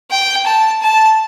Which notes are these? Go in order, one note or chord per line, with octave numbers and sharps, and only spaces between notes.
G5
A5
A5